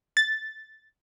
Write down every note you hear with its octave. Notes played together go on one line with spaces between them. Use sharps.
A6